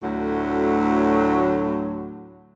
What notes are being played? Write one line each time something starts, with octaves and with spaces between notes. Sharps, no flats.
D2 A2 F#3